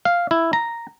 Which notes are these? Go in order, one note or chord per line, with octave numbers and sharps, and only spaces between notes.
F5
E4
A#5